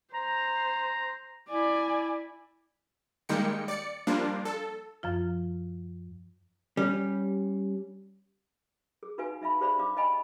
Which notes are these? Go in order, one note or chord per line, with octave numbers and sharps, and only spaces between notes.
C5 A#5
E4 D5 G#5
D#3 G3 G#3 A#3 G5 C#7
D5 C#7
F3 G3 A#3 D4 F4
A4
F#2 F3 F4
G3 C#4
G#4
D#4 F#4 B4 F5 F#5 G#5
D#4 E5 F5 B5
G4 G#4 C5 D5 F5 B5
D4 F5 D6
D#5 F5 G5 G#5 B5